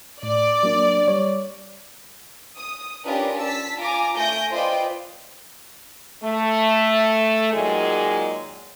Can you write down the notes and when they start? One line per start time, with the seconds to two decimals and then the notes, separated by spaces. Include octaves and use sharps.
0.23 A2 D5
0.63 F#3 A#3 D4
1.08 G3 C#5
2.56 D#6
3.05 C#4 D4 F4 G4 A#4 B4
3.39 A5 E6 B6
3.78 F4 G#5 A#5 D6
4.16 A3 G#5 G6 A#6 D7
4.50 F4 B4 C5 D5 D#5 G5
6.24 A3
7.54 A#2 D#3 F#3 G#3 G#4